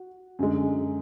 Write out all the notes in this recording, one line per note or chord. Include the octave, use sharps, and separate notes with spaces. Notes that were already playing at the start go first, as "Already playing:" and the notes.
Already playing: F#4
F#2 D3 G#3